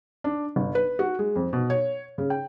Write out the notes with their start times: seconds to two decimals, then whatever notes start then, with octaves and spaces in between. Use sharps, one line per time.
0.24 D4
0.56 G1
0.75 B4
0.99 F#4
1.19 G#3
1.36 F2
1.53 B2
1.70 C#5
2.18 C#3
2.30 G5